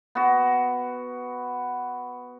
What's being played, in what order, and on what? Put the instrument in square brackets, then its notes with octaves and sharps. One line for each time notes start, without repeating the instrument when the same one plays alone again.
[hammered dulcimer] B3 F#4